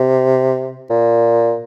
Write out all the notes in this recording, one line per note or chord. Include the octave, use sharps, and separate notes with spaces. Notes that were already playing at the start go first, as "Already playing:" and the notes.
Already playing: C3
A#2